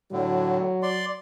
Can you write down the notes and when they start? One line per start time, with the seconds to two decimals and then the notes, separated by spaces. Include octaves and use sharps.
0.12 A2 D3 F#3
0.83 D5 C6